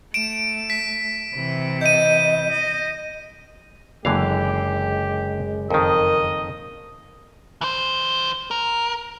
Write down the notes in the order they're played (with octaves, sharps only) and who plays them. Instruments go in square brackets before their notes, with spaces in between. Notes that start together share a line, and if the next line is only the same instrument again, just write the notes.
[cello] A3 [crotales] D7 E7
[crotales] B6
[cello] C3 E3
[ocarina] D#5 [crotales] G6 D#7
[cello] D#5
[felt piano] F#1 [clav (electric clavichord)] D3 E3 F5 [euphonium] G#3 [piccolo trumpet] G4
[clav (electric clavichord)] F2 D#3 [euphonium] A#4 [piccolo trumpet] D#5
[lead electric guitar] E3 C5
A#4